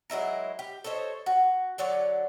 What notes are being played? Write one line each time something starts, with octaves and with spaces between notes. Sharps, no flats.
F#3 G#3 E4 A#4
G4
A4 C5 C#5 D#5
F#4
D3 F#3 C#5 D5